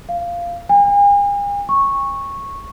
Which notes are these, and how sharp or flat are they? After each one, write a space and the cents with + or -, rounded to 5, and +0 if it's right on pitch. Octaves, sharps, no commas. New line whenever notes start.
F5 -10
G#5 -45
C#6 -10